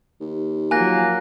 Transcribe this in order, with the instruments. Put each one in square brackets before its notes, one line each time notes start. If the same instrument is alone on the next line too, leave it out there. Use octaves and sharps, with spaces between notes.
[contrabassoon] D#2
[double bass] F3 F#3 [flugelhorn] A#3 [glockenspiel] G#5 F#6 A#6